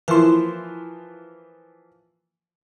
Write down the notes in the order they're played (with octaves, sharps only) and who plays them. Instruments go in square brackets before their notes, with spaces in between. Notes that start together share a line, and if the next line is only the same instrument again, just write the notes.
[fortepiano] E3 F3 A#3 [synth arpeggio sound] E4 C6